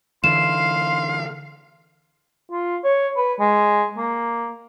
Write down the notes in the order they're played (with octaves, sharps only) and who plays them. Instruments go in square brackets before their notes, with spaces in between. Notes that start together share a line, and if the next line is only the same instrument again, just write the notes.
[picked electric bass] D3 E3 [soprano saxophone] F5 [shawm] C6 [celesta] E7
[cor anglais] F4
C#5
B4
G#3
A#3